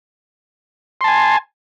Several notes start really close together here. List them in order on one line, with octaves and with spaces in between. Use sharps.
C6 A5 G#5